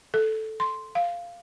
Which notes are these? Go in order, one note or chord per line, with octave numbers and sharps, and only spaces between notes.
A4
C6
F5